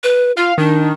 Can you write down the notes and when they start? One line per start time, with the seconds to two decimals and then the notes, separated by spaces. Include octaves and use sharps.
0.04 B4
0.37 F4 F5
0.58 D#3 D4